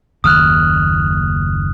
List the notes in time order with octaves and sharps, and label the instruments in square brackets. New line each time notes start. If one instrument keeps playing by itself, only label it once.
[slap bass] F#1 D#2 C#3 [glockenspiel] D#6 F6 F#6